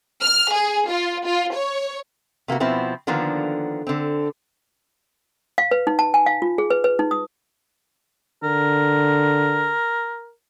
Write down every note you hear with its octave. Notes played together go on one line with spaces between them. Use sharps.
F6
G#4
F4
F4
C#5
C3 A#3 B3 F#4
B2 F3 B3 C4 E4
D3 D#3 F3 A#3 B3 D4
D3 C4
F5
B4
D#4
A5
G#5
F5
F4
G#4
B4
B4
D#4
D#6
D3 A#4